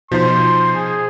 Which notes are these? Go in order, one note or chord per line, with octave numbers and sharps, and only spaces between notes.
B2 F3 D#4 C5 C6
G#4